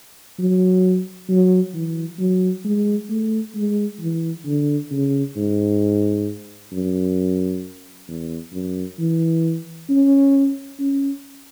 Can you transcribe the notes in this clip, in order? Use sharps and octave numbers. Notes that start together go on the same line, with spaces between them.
F#3
F#3
E3
F#3
G#3
A3
G#3
E3
D3
C#3
G#2
F#2
E2
F#2
E3
C#4
C#4